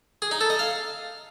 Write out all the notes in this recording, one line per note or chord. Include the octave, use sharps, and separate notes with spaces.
G#4
D#4
A4
D#5
F5